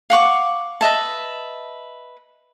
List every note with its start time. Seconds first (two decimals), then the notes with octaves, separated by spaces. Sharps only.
0.10 F5 F#5 C#6 D6
0.81 B4 D#5 E5 A5